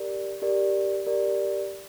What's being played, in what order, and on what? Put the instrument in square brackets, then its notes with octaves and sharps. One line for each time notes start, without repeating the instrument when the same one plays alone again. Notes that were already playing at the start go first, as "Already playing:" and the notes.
Already playing: [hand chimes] G4 A#4 D5
G4 A#4 D5
G4 A#4 D5